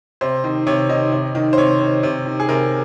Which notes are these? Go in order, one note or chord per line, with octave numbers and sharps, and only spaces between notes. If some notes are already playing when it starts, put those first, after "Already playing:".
C3 C5
D#3
C3 C#5
D#3 D#5
C3
D#3
C5
C3 C#5
D#3
C3
D#3
G#4
C3 A#4